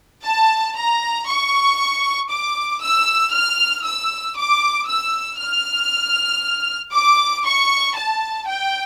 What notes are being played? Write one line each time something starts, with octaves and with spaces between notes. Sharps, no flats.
A5
A#5
C#6
D6
E6
F6
E6
D6
E6
F6
D6
C#6
A5
G5